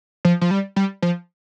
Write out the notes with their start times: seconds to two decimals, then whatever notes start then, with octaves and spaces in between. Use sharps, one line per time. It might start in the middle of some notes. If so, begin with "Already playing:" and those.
0.25 F3
0.41 F3
0.51 G3
0.76 G3
1.02 F3